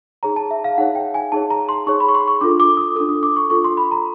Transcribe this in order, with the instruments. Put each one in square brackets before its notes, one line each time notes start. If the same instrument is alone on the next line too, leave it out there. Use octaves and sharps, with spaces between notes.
[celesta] D#4 G#4 C#5 A#5
A5
E5
F5
D#4 G#4 C#5 F#5
G5
G#5
D#4 G#4 C#5 A5
A#5
C6
D#4 G#4 C#5 C#6
B5
C#6
C6
C#6
D4 F4 A4 D6
D6
D#6
D4 F4 A4 D#6
D#6
D6
C#6
D4 F4 A4 C#6
C6
B5
A#5